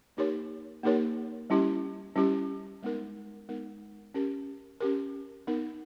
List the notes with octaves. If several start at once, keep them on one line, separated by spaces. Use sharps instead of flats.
A#3 D#4 G4 A#4 C#5
A#3 D#4 G4 A#4 C#5
G3 C#4 E4 G4
G3 C#4 E4 G4
G#3 B3 D#4 A#4
G#3 B3 D#4 A#4
C#4 G4 A#4
C#4 G4 A#4
B3 D#4 A#4